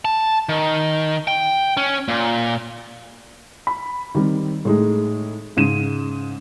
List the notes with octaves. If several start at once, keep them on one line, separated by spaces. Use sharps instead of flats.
A5
D#3
G5
C#4
A#2
B5
D#3 G3 C4
A2 G#3 D#4
G#2 C#3 D#7 E7